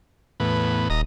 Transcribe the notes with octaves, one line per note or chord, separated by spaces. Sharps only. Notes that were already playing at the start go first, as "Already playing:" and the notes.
E2 A2 B3
D#1 D#5 A#5